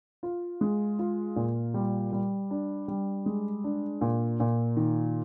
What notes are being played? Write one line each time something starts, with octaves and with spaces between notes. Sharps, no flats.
F4
G#3
F4
A#2
G3
G3
D4
G3
G#3
D4
A#2
A#2
D#3